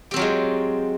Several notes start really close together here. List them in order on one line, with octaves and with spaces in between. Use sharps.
G4 C4 F#3 F4 G#3